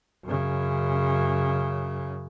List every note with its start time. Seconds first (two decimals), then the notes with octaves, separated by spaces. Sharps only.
0.24 F#2 C#3